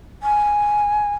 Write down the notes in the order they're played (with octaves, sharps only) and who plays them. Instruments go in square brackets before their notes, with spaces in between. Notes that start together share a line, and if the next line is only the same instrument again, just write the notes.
[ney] G#5